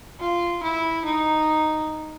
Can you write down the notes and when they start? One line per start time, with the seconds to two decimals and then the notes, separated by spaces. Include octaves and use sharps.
0.20 F4
0.63 E4
1.05 D#4